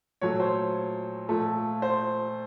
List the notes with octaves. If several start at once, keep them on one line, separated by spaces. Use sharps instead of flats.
A#2 F#3 A3 C#5
C5
A#2 F3 A3
C5